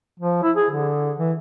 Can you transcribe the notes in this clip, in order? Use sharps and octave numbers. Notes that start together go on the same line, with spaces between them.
F3
E4
G#4
D3
E3